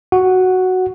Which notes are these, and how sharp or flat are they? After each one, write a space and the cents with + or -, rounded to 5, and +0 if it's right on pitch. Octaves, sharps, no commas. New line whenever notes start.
F#4 +0 F#5 +0